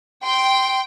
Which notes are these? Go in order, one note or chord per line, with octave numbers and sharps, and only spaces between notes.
G5 C6